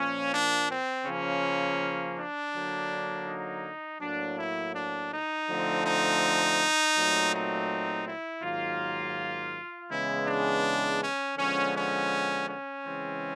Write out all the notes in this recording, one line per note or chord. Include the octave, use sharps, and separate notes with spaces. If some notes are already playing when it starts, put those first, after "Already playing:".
Already playing: A#2 F3 A#3 C#4
D4
C4
C#3 F3 A#3 C#4
D4
D3 F#3 A#3
D#4
A2 F#3 A#3 D4
E4
D4
D#4
D3 F3 A3 C4
D#4
A#2 F#3 A3 C4
D#4
E4
G#2 D#3 F#3 A#3 F4
C#3 E3 G#3 B3 E4
D4
C#4
D3 F3 G#3 B3 C#4
C#4
C#4
C#3 E3 G#3 C4